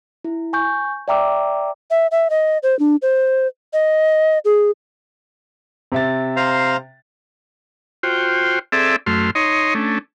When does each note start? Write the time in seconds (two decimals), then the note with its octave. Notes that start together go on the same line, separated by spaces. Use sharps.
0.24 E4
0.53 G#5 C#6 G6
1.08 D5 E5 G5 A#5 D6 E6
1.91 E5
2.11 E5
2.30 D#5
2.63 C5
2.79 D4
3.02 C5
3.73 D#5
4.45 G#4
5.92 C3 E5 A6
6.36 C5 F5 A#5
8.03 F4 F#4 C5 G5
8.72 C4 G#4 A4 D5 E5
9.06 F#2 A3 C6 F6
9.35 D#4 C#5 D#5 C6
9.75 A3 C#4 D4